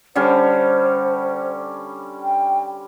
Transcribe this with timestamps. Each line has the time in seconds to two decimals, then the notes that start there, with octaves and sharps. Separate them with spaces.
0.15 D3 G3 C#4 C5
2.22 G5